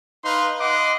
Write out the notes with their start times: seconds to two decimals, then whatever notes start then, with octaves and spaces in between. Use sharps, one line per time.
0.24 D#4 B4 F5 C6
0.60 D#5 F#5 C6 D6